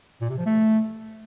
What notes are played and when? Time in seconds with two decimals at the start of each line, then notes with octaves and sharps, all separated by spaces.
0.21 A#2
0.29 C3
0.38 F3
0.46 A3